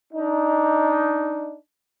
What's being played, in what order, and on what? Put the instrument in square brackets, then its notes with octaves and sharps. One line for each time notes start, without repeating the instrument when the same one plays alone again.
[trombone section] D4 D#4